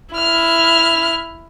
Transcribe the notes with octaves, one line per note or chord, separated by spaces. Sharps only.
E4 F6